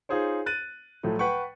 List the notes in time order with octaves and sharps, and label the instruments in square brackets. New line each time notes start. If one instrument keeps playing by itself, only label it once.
[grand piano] D#4 F4 G#4 C5 C#5
F#6 A6 D#7
A2 F3 F#3 A3
B4 F#5 G5 C#6